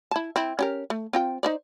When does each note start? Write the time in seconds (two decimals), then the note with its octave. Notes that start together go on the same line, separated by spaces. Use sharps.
0.11 E4 A5
0.36 C4 E4
0.59 C#4 G4 A#4
0.90 A3
1.13 C4 F4 G5
1.43 D#4 C5 D5